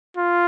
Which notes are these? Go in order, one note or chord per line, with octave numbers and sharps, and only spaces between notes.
F4